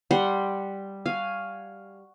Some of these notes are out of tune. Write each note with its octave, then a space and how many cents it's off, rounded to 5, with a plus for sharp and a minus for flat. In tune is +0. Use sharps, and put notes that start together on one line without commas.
G3 +0 F#5 +0 C6 +0
F#4 +0 F5 +0 G#5 +0